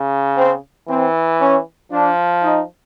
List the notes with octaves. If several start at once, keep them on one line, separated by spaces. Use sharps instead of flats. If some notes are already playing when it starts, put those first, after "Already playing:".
Already playing: C#3
C4
E3 C4
C#4
F3 D4
D#4